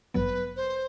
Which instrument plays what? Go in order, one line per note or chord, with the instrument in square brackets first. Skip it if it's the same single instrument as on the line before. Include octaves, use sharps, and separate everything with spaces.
[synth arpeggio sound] A1 G2 F#3 B3 [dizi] B4
[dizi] C5